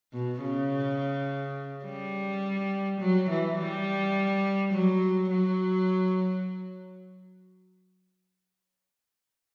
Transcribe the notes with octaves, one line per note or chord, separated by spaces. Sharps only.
B2
C#3
G3
F#3
E3
G3
F#3
F#3